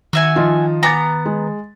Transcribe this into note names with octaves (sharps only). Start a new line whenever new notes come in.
D#3 F#4 E5 G#5
F3 D#4 F4
B3 G#5 A#5 D6 A6
G#3